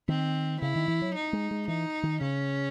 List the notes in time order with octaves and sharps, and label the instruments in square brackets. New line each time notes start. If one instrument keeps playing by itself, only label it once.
[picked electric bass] D#3 [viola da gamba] C4
[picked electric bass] C#3 [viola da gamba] E4
[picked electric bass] D#3
E3
F#3
[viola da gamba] D#4
[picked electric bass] G#3
G#3
[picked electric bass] E3 [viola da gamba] D#4
[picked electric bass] D#3
[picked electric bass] C#3 [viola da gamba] C#4